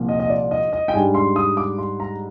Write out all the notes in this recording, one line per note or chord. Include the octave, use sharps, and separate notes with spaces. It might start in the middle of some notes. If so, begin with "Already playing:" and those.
Already playing: C2 A#2 F3 A#3
D#5
D#5
D5
D#5
D#5
G5
G#2 G3 D4 G#5
C6
D#6
D6
C6
A#5